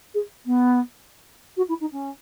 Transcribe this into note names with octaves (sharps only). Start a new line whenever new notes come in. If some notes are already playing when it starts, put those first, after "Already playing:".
G#4
B3
F#4
E4
D#4
C#4